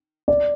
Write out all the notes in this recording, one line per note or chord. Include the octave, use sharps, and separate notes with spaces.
D5